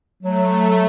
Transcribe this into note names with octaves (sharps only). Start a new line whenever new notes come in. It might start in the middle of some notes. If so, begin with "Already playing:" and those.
F#3 A3